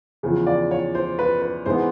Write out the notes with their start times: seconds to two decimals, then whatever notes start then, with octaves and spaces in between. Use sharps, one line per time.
0.23 E2 C#3 F3
0.47 D5
0.71 C#5
0.95 C5
1.19 B4
1.42 B4
1.66 G#2 E3 G#3 B3 C5